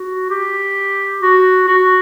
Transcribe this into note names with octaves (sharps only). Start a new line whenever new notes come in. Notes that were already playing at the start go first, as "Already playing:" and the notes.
Already playing: F#4
G4
F#4
F#4